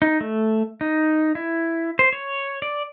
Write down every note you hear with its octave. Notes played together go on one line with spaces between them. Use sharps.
D#4
A3
D#4
E4
C5
C#5
D5